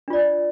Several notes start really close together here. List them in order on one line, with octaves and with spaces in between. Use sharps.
D4 F4 D5